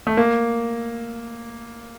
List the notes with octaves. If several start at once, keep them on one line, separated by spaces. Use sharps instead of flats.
A3
A#3